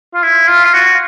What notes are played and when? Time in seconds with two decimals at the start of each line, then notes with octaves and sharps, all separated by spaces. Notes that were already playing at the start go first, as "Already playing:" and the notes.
0.14 F4
0.23 E4
0.48 F4
0.65 F4
0.73 F#4